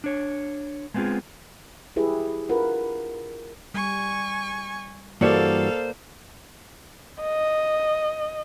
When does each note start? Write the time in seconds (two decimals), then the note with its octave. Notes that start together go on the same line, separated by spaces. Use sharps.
0.04 D4 C#5
0.94 G#3 A3 B3 C4 F4 G#4
1.96 E4 G4 G#4 B4 E5
2.49 D4 F4 A#4 B4 F#5
3.74 G3 G#5 C#6
5.21 G2 E3 A#3 F#4 A4 C5 D5 F5
7.22 D#5